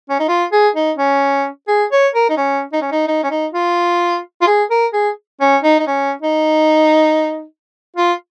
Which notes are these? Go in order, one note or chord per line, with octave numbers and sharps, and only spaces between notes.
C#4
D#4
F4
G#4
D#4
C#4
G#4
C#5
A#4
D#4
C#4
D#4
C#4
D#4
D#4
C#4
D#4
F4
F4
G#4
A#4
G#4
C#4
D#4
D#4
C#4
D#4
F4